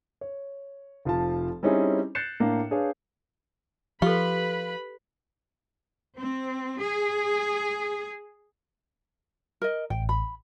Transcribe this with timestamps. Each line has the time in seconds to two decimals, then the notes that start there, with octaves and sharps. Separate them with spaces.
0.21 C#5
1.05 F1 F3 F4 A5
1.63 G3 C4 C#4 D#4 E4 G#4
2.15 F#6 G6 A6 C7 C#7 E7
2.40 A2 A#3 D4
2.71 D4 G#4 B4 C#5 F5
4.02 F3 F4 G4 A4 B4 B5
6.19 C4
6.83 G#4
9.61 A#4 D#5
9.90 A1 G5
10.09 B5